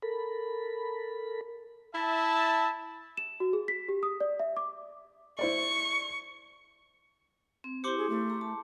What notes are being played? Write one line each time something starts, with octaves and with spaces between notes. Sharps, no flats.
A4 A#4 B5
E4 E5 A5
E7
F#4
G#4
B6
G4
D#6
D5
E5
D6
E4 C5 D5 C#6
C4
E4 G4 C5 C6 D6 C#7
G#4
A3
A#5
A5